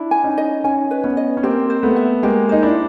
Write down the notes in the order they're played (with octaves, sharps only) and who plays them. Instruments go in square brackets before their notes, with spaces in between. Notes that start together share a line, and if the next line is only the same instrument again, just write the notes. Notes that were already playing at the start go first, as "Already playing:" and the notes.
Already playing: [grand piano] D4 E4
[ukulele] G#5
[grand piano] C#4 D#4
[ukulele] D#5
[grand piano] C#4 D#4 [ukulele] G#5
[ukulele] B4
[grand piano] B3 C#4
[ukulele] D#5
[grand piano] C#4
[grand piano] A#3 C4 [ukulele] G4
[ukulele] C5
[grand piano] A3 B3
[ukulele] E5
[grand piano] G#3 A#3 [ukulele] G4
[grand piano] D#4 [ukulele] C5
[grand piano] D4 E4